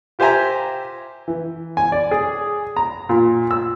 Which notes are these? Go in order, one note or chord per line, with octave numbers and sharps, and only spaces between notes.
F4 G4 C5 E5 G#5 A#5
E3
G#5
D5
G#4
A#5
A#2
E6